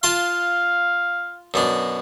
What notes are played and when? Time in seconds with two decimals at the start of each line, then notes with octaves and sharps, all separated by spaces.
0.03 F4 F5 A5 C6
1.54 F#2 B2 D4